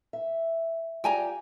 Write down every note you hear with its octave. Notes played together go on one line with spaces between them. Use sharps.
E5
F4 G4 D5 G5 G#5 A#5